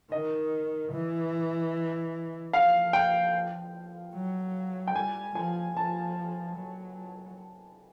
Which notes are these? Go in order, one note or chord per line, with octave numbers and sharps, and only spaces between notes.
D#3 D#5
E3
F3 F5
G5
F#3
G5
G3 G#5
F3 G#5
F3 A5
F#3